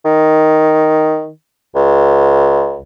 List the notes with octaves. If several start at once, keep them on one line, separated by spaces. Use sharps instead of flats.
D#3
C#2